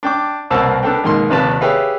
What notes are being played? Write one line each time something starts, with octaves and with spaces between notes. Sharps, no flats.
D4 G5 D6
C2 B2 A#3 C4 A5 E6
B3 D4 A4 A#4 G5
G#2 B2 D#3 A#3 D#4 C6
A#1 D#2 C3 B4 D5 A5
G4 G#4 B4 C#5 E5 F5